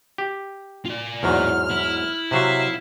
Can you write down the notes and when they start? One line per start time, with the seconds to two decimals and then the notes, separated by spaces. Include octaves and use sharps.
0.18 G4
0.85 F4 D5
1.23 E2 G#2 F#3 F6
1.70 E4
2.31 C3 F#3 F#4 E5 F5